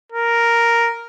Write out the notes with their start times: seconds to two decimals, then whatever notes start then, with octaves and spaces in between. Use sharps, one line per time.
0.12 A#4